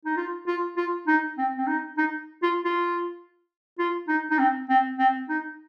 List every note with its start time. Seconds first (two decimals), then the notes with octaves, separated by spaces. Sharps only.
0.05 D#4
0.17 F4
0.47 F4
0.77 F4
1.07 D#4
1.38 C4
1.58 C4
1.67 D#4
1.98 D#4
2.43 F4
2.65 F4
3.79 F4
4.08 D#4
4.31 D#4
4.39 C4
4.69 C4
4.99 C4
5.29 D#4